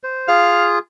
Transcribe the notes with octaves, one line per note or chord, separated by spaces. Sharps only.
C5
F4 G#4 F5